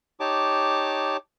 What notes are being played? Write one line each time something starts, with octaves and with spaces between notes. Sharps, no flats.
D#4 G4 C#5 A5 D6